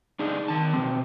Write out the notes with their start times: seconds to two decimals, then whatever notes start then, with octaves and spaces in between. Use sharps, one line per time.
0.19 D4 D#4 G#4
0.48 D#3 A5
0.74 B2 E3 C4